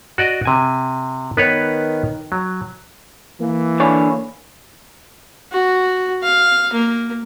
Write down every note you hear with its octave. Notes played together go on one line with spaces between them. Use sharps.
F#4 D5 D#5
C3 G#5
D#3 B3 B4 C#5
F#3
E3 A#3
D3 D4 C#5 G#5 B5
F#4
F5
A#3